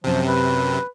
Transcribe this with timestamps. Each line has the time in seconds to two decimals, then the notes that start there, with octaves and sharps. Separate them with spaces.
0.04 F#2 C3 F3
0.27 B4